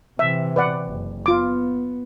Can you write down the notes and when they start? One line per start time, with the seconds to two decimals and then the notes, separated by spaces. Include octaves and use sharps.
0.19 C3 E3 E5
0.56 B4 D5 F#5
0.86 F#1
1.26 B3 F4 D6